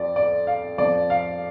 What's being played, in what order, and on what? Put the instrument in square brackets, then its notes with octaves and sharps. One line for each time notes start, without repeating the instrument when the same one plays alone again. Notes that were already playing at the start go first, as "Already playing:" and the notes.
Already playing: [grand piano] F2 F3 D5
D5
F5
F2 F3 D5
F5